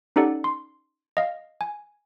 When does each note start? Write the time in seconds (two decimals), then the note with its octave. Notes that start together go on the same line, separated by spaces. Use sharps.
0.16 C#4 D#4 G4 A4 D5 F#5
0.44 C6
1.17 D#5 F5
1.61 G#5